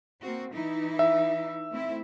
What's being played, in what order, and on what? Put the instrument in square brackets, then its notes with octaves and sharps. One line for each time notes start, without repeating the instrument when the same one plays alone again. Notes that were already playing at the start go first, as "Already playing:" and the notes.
[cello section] A#3 C4 F#4
E3 D#4 E4
[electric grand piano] E5
[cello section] A3 C4 E4